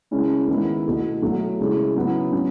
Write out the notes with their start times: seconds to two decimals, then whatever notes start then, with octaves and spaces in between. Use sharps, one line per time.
0.11 C#3 G#3 C#4 E4
0.48 D#3 G#3 B3 E4
0.85 B2 A3 E4
1.22 B2 F#3 A3
1.58 C#3 G#3 C#4 E4
1.95 C#3 F#3 B3 E4
2.32 F#3 C#4